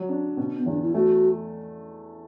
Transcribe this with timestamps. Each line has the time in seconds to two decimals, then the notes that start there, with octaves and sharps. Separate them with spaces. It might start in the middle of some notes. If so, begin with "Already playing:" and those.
Already playing: F#3
0.09 D4
0.37 B2
0.57 B3
0.66 E2 D4
0.82 E4
0.94 A3 F#4